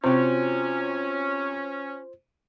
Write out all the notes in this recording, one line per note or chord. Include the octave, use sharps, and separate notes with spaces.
C3 C#4 F4 F#4 C5 G5